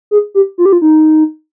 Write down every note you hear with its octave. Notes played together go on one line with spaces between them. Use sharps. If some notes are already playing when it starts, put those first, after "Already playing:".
G#4
G4
F4
G4
F4
D#4